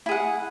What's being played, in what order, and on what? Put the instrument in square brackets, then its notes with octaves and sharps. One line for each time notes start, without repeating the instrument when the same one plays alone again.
[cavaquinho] E4
G#4
F#5